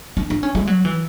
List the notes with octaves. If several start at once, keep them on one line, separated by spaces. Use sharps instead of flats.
D4
D4
C#4
G#3
F#3
E3